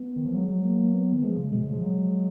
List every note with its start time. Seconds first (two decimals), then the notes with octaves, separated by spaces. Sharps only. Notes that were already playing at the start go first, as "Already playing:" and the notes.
Already playing: B3
0.16 D#3
0.25 F3
0.33 F#3 G#3
0.48 F#3
0.64 A#3
0.93 B3
1.12 D#3
1.23 F3 G#3
1.37 C#3
1.52 B2 G#3
1.62 C#3
1.72 F3
1.82 F#3